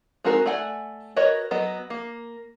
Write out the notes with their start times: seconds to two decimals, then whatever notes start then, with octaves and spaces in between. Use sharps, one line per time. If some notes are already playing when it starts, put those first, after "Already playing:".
0.24 G#3 C4 D#4 F#4 A#4
0.46 A3 D5 F#5 G#5
1.16 F#4 A#4 B4 C#5 D#5
1.51 F#3 B3 D#5
1.90 A#3